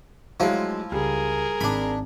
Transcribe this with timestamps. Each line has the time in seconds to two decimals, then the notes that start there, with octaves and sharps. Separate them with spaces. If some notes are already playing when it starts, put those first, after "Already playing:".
0.40 F3 F#3 G#3 A3 D4 E4
0.92 C#2 G3 G#4 A#4
1.61 G#1 G#2 D4 B5